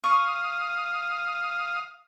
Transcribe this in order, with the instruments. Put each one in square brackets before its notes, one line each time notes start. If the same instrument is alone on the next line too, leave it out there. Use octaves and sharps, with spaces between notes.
[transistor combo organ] F5 D#6 [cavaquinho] C#6